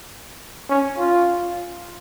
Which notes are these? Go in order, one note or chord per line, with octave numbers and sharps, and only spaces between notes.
C#4
F4